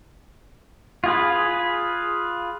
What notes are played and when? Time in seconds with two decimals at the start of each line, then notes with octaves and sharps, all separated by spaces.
1.04 F4 G#4 B4